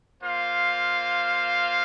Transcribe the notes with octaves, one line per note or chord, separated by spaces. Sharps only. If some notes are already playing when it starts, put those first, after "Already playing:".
A#3 F4 C5 F5